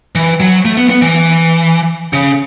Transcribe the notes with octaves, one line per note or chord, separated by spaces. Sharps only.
E3
F#3
A3
B3
B3
E3
C#3